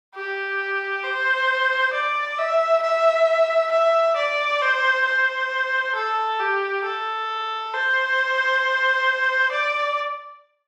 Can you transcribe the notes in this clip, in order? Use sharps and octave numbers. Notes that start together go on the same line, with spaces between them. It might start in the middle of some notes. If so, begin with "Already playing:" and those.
G4
C5
D5
E5
E5
E5
D5
C5
C5
A4
G4
A4
C5
D5